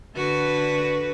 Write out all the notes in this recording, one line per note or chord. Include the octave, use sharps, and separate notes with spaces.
D3 F#4 B4